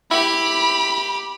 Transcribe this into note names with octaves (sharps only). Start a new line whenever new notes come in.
E4 G4 B5